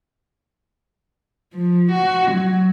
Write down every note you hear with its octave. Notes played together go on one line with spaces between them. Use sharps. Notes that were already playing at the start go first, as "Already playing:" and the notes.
F3
F#4
F#3